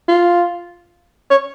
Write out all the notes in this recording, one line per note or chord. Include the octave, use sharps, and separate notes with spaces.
F4
C#5